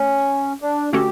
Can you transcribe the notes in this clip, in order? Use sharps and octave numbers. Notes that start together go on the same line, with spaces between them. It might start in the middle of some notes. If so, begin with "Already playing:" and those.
Already playing: A3 C#4
D4
D3 A3 C#4 F#4 G4 A4